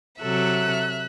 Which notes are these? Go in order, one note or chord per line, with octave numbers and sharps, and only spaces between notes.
C3 F#3 A4 E5 F#6